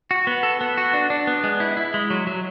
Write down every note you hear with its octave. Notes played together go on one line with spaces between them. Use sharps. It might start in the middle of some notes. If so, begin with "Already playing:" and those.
F#4
B3
A4
B3
F#4
D4
D4
B3
G#3
E4
E4
G#3
F#3
F#3